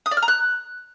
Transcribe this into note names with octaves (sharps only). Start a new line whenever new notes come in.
D#6
D5
F6
A#5
F#6